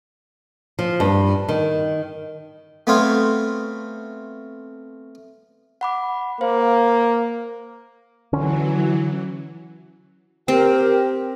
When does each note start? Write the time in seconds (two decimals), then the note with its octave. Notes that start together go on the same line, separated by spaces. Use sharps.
0.79 F3
1.00 G2
1.49 D#3
2.87 A3 B3 C4 C5 C#5 F5
5.81 F#5 B5 D6
6.41 A#3 C5 F5
8.33 D3 E3 F#3 C#4
10.48 C4 G4 A#4